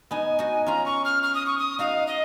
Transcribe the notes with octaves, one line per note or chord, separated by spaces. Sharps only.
B3 D#4 G#5
D#4 F#4
C#4 F4 A#5
C#6
F6
F6
D#6
C#6
D#6
D#4 F#4 F5
D#5